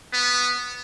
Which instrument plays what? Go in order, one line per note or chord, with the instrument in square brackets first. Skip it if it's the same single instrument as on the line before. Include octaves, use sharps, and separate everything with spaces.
[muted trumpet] B3